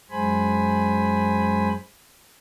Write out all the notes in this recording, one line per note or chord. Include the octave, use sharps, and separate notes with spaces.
F#2 G#3 C5 G#5 B5